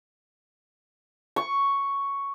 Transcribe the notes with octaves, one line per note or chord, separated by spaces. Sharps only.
C#6